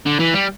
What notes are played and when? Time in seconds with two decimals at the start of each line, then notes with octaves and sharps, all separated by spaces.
0.06 D3
0.19 E3
0.34 G3